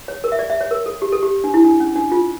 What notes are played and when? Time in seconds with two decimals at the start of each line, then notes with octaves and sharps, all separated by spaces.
0.08 C#5
0.24 A#4
0.32 E5
0.39 D5
0.50 E5
0.61 C#5
0.71 A#4
0.86 A4
1.02 G4
1.12 A4
1.23 G4
1.44 D4
1.54 E4
1.64 D4
1.80 C#4
1.96 D4
2.12 F4